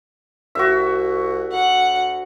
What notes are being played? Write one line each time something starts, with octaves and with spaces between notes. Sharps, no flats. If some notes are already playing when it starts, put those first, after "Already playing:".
C2 F#4 E5
D2 F#5